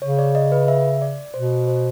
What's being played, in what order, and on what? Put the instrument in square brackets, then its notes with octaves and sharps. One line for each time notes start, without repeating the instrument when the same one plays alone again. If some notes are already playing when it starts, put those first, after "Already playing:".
[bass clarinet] C#3 [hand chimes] C#5
[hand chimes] D5
D#5
B4
E5
D5
[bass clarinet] B2 [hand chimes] C5
[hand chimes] C5